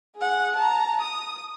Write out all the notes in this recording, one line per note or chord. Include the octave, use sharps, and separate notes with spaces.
G#4 F#5
A5 A#5
D#6